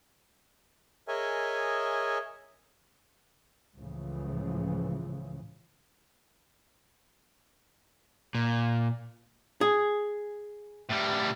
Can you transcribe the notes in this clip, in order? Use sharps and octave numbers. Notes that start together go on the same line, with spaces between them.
G#4 A#4 C#5 D#5 E5 G#5
C#2 A2 C#3 E3 F3
A#2
G#4
A2 G3